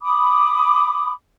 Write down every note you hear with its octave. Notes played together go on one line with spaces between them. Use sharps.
B5 D6 D#6